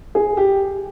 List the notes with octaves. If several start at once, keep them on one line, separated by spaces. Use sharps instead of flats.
G#4
G4